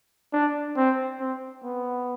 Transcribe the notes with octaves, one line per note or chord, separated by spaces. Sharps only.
D4
C4
C4
B3